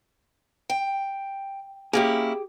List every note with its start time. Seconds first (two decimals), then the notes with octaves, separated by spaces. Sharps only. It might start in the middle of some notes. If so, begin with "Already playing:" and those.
0.70 G5
1.93 A#3 C#4 E4 G4 G#4